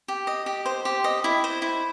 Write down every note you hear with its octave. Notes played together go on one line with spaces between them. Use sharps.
G4
D#5
G4
C5
G4
D#5
E4
C5
E4